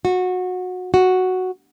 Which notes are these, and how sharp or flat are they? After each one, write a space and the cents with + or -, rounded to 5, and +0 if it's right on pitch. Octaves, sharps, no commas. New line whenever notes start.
F#4 -20
F#4 +0